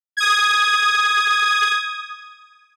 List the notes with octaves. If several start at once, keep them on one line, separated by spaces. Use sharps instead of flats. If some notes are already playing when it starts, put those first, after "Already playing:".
D#6 G#6